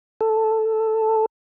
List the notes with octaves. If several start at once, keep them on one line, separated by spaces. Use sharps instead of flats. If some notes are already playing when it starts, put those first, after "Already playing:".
A4